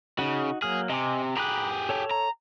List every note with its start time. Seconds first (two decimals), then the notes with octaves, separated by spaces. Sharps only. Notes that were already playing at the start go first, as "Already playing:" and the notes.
0.19 C#3 D#4 F#4
0.62 F#3 A#3 G#4 F6
0.90 C3 D#5 G#5 D6
1.37 G4 G#4 A#5 B5 F#6
1.89 A4 C#5 A5
2.11 A#5